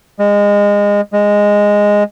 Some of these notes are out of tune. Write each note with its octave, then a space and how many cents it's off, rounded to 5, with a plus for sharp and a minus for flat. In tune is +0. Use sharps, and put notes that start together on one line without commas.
G#3 -25
G#3 -10